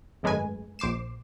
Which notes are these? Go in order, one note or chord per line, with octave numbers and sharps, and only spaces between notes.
G#1 F#2 G#3 A3 B4 G#5
A#1 C5 D6 C7 E7